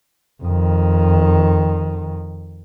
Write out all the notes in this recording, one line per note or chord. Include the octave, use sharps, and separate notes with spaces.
F2 D#3